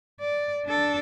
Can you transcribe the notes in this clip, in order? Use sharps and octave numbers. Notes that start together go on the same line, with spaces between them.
D5
D4 A4